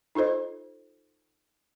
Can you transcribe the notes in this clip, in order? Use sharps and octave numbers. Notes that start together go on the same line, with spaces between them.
D#4 F4 A4 C5 D#5